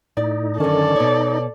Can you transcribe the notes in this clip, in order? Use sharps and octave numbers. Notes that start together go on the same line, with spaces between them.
A2 D#4 D5
F#2 D3 D#3 C#4 A4 D5 A5
B2 D#4 C#5